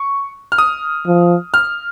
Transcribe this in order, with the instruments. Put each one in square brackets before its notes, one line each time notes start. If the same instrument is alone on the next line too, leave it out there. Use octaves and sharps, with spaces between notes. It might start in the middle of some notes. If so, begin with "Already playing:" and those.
Already playing: [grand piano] C#6
F6
D#6
[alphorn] F3
[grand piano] F6